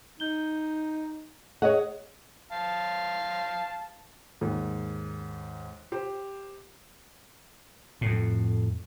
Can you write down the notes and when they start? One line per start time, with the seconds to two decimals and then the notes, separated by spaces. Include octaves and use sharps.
0.20 D#4 G6 G7
1.62 G#4 C#5 D#5 F#5
2.52 F5 A5
4.41 D#2 G#2
5.92 G4 C5
8.01 F2 A2